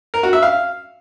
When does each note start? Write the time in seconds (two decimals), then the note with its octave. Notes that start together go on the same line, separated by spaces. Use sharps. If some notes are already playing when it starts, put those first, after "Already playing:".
0.14 A#4
0.23 F#4
0.33 E5
0.43 F5